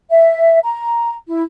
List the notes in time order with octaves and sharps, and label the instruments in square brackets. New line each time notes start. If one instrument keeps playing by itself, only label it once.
[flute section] E5
A#5
E4